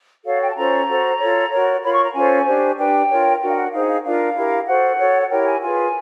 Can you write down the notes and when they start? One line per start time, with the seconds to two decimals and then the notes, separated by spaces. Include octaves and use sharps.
0.25 F#4 A4 C#5 F5
0.40 G5
0.50 A5
0.56 C#4 F4 A4 C5 A#5
0.88 F#4 A4 C5
1.19 F4 A4 C#5
1.51 F#4 A#4 C#5
1.83 F4 A#4 C#5 B5
1.94 C#6
2.04 A#5
2.14 C#4 F4 A4 C5 G#5
2.46 D4 G4 C5
2.77 D4 G4 B4 G5
3.09 F4 A#4 C#5
3.41 D4 F#4 A#4 G5
3.49 F5
3.56 F#5
3.72 D#4 G#4 C5 F5
3.87 F5
4.03 D4 F4 A#4 F5
4.35 E4 G4 A#4
4.67 F#4 A4 C5 F#5
4.98 F#4 A4 C#5
5.22 F#5
5.30 E4 G4 A#4 C#5 G5
5.46 G#5
5.62 F4 G#4 B4 G#5